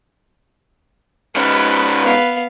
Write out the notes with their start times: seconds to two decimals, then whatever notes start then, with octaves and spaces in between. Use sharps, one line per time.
1.36 G#2 C#4 B4
2.03 B3 F5